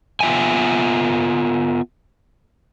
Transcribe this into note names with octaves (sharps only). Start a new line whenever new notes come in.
B3 F4 E5 G5 G#5